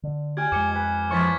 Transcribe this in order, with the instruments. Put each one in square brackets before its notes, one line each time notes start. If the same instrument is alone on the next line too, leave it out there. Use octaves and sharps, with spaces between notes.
[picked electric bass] D3
[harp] G4 G#5 [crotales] F6 G#6
[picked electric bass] F2 G#3 [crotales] D6 C#7 G7
[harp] B4 G#5
[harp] E3 C#5 C#6 [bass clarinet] F3 [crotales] G#6 A6 B6